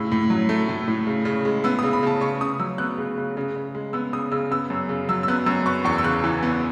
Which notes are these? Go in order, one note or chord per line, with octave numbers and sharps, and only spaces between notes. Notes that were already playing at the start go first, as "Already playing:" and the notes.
Already playing: A2 C#3 E6
A2
F#3
A3
A2
A2
C#3
C#3
G#3
B3 E6
C#3 D#6
B5
C#3 A5
C#3 C#6
C#3 D#6
F#3 E6
B3 F#6
C#3
C#3
C#3
C#3
G#3
B3 E6
C#3 D#6
C#3 E6
B3 E6
F#2
C#3
F#3 E6
E6
B3 F#6
F#2 E6
B3 C#6
E2 C#6
E6
C#3 F#6
E3
B3